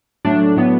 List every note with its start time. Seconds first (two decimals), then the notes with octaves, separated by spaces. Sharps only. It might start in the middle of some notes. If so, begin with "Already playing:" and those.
0.25 A2 F#3 A3 D4
0.56 A2 F#3 B3